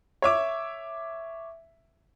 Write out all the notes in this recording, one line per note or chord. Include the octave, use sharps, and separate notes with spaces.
C#5 E5 D6